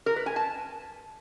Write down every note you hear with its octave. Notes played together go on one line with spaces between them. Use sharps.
A#4
B4
G#5
A5